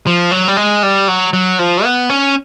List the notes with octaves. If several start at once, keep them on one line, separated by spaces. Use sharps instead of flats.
F3
F#3
G3
G#3
G3
F#3
F#3
F3
B3
C#4